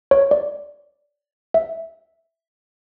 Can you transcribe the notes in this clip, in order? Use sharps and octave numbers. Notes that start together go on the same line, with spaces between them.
C#5
D5
E5